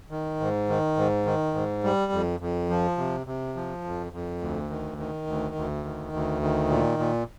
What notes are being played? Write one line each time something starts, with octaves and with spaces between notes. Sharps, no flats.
D#3
G#2
D#3
G#2
D#3
G#2
G3
F2
F2
F3
C3
C3
F3
F2
F2
D2
D#3
D#3
D2
D2
D#3
D2
D#3
A#2
A#2